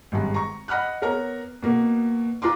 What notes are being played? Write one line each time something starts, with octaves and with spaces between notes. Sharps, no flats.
G#1 G2 G#3
A#5 C#6
D#5 F#5 B5 F6 F#6
B3 A#4 C#5 A#5
B2 A#3 B3
F4 B4 A#5 C6 D6